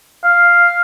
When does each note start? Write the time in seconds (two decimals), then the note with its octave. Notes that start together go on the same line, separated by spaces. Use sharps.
0.24 F5